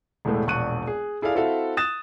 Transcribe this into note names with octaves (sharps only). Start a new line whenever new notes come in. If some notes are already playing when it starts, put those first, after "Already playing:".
E1 A2 G#3 A3
E1 A#1 C#6 F#6 D#7
G#4
E4 G#4 A4 D5 F5
C4 E4 F#4 A4 E5 F5
D#6 F#6 A6 E7